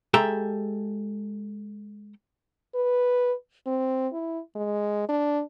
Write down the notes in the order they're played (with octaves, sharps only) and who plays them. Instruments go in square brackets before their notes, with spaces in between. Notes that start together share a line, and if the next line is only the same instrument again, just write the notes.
[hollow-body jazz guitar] G#3 G4 A4 E5 A#5
[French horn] B4
C4
E4
G#3
D4